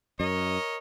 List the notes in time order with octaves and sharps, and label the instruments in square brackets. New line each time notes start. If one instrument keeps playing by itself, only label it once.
[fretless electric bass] F#2 [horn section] A#4 C#5 D#5